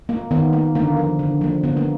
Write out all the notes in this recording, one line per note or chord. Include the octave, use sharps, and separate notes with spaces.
A#3
D#3 B3
A#3
D3 A#3
F3 A#3
D3
F3 A#3
D3 B3
A#3